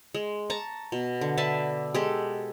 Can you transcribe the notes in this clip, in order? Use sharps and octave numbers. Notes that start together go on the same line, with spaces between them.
G#3
A5 A#5 C#6
B2
D3
D4 B4 E5 A5
G#3 G4 A4